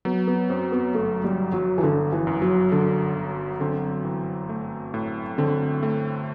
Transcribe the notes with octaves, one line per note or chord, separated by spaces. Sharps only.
F#3 B3
B3
F#2 C4
B3
G1 A3
G3
G1
F#3
E3
G1 D3
E3
F#2
F#3
D3 F#3
G1
D3 C4
E3
A3
A2
D3 C4
A3